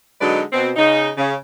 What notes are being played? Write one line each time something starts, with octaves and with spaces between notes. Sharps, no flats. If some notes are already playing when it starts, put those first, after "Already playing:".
D3 F#3 G#3 D#4 B4 D5
B2 C4
C#3 D#4
C#3